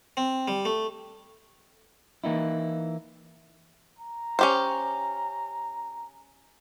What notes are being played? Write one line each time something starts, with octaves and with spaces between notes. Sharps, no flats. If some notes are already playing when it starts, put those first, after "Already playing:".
C4
G3
A3
E3 A#3 D#4 E4
A#5
C#4 G4 C5